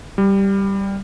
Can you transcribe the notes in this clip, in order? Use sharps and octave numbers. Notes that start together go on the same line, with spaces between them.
G3